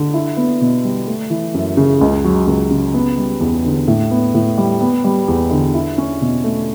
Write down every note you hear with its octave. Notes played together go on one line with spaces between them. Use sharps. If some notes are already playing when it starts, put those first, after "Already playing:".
Already playing: D3
E4
B3
B2
G3
A3
E3
F#2
C#3
C#2
F#3
C#2
C#3
B3
G3
E2
D3
A2
B3
A2
G3
B3
G3
E2
D3
E4
C#4
B2
A3